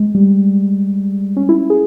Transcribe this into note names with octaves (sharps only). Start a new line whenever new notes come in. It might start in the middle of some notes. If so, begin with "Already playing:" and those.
Already playing: G#3
G3
C#4
E4
G#4